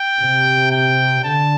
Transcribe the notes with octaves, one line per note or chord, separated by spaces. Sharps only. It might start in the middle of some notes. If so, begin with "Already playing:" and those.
Already playing: G5
C3
G5
D3 A5